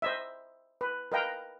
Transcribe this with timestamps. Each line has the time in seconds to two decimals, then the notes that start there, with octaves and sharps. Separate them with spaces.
0.02 C5 D#5 E5
0.81 B4
1.12 A#4 B4 D#5 F5 G5 A#5